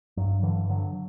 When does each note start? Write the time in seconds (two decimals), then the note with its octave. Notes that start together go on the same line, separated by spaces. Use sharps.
0.17 G2 F#3
0.43 D3 E3
0.70 D3 F#3